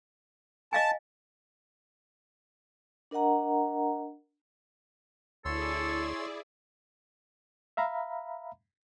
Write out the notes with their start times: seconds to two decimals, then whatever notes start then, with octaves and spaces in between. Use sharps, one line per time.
0.73 D#5 F5 G#5 A5
3.11 D4 A#4 D#5 F#5 A#5
5.45 D2 E4 G#4 A4 C#5 D5 C6 E6
7.77 E5 F5 A#5 B5